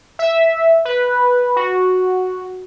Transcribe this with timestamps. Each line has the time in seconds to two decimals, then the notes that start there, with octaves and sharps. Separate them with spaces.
0.19 E5
0.85 B4
1.56 F#4